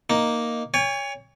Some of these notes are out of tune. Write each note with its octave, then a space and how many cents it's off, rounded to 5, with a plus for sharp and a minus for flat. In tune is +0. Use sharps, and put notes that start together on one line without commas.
A#3 +0 D#4 +0
C#5 +20 G#5 -40